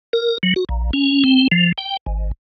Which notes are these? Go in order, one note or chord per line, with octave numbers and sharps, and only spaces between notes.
A#4
F#3
F#4
A#1
C#4
C4
F3
G5
G#1